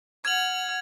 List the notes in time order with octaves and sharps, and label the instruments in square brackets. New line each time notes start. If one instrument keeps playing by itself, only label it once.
[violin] F#5 F6 [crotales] G#6 F#7